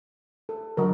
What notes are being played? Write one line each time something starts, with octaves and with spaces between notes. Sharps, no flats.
A4
D3 F#3 A#4